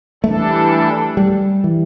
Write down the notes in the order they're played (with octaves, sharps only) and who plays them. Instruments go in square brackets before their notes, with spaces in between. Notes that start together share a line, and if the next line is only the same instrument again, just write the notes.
[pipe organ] E3 G3 D4 A4 [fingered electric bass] A3
[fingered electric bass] G3
E3